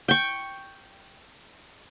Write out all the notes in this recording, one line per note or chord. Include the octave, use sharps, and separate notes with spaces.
G5 C#6